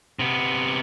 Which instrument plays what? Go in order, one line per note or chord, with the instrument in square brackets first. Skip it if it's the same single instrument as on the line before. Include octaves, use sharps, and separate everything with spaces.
[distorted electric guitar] C3 B3